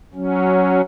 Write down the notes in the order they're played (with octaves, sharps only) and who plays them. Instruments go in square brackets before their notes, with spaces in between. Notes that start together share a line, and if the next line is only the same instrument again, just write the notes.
[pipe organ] F#3 C#4